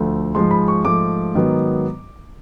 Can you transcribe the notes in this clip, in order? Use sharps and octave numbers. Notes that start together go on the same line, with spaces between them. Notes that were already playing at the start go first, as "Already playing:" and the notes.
Already playing: D2 D3 F3 A3
G#2 F3 G#3 C6
B5
C#6
G#2 F3 A3 D6
G#2 D#3 F#3 B3